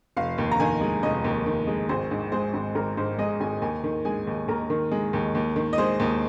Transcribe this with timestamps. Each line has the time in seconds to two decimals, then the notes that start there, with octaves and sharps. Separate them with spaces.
0.17 F1 F5
0.38 D#2
0.51 A#5
0.60 D#3 G#5
0.81 G#3
1.03 F1 D#5
1.24 D#2
1.46 D#3
1.67 G#3
1.89 G#1 C5
2.11 G#2
2.32 G#3 C5
2.54 G#1
2.75 G#1 A#4
2.97 G#2 C5
3.18 G#3 D#5
3.40 G#1 G#5
3.62 D#2 G#5
3.84 D#3
4.05 G#3 G#5
4.27 D#2
4.48 D#2 A#4
4.70 D#3
4.91 G#3
5.13 D#2
5.35 D#2
5.56 D#3
5.73 D#5
5.78 G#3 C5
6.00 D#2